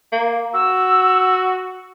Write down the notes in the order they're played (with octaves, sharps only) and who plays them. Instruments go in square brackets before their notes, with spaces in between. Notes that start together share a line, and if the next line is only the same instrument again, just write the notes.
[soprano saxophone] A#3
[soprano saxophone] F#4 [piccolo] E6